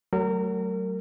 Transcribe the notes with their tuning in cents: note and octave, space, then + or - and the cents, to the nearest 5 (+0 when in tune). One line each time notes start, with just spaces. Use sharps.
F#3 +25 A3 +0 A#4 -25